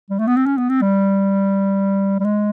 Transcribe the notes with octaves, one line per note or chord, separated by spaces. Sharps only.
G3
A3
B3
C4
C#4
B3
C4
G3
G3
G#3